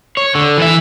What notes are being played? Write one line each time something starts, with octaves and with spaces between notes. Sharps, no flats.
C#5
D3
E3 E5